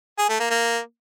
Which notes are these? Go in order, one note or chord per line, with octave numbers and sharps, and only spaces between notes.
G#4
A3
A#3
A#3